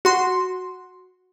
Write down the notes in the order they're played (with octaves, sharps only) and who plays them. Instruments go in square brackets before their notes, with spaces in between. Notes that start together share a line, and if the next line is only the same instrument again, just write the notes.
[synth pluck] F#4 C6